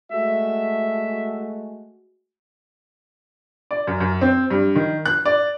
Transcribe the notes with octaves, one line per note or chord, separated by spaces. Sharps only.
G#3 A3 F#4 E5
D5
F#2
F#2
C4
G2
D#3
F#6
D5